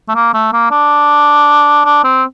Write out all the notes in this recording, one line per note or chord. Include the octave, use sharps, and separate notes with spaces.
A3
A#3
A3
A#3
D4
D4
C4